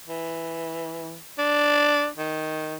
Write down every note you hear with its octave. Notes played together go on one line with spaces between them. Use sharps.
E3
D4
D#3